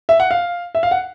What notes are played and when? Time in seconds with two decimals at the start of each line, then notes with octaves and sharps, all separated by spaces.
0.09 E5
0.20 F#5
0.31 F5
0.75 E5
0.83 F5
0.91 F#5